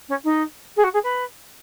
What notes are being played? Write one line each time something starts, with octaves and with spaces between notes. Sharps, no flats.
C#4
D#4
G#4
F#4
G#4
B4